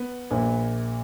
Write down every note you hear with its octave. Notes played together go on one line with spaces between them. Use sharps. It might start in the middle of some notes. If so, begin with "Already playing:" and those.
Already playing: B3
A#1 A#2